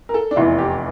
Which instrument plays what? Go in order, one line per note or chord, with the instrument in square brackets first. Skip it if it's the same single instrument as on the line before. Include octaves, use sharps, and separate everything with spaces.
[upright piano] A#4
A4
D4
F1 E2 E3 E4
G4